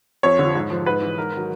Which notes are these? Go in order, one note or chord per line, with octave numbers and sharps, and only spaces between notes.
F2 C#5
D3
F3
G#2
F3
G#2 B4
E3
G#2 A#4
D#3 F#3